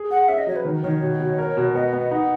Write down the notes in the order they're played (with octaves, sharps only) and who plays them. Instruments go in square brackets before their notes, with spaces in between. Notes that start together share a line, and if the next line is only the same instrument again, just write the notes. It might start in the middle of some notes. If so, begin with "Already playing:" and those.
Already playing: [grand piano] G#4
[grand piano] G#4 [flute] F#5
[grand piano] C#4 [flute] E5
[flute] D#5
[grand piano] F#3 [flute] C#5
[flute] B4
[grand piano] D#3
[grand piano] D#3 [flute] C#5
[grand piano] B2
B2
A#4
B2
[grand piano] B3 [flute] D#5
[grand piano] B3
[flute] D#5
[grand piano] D#4 [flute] F#5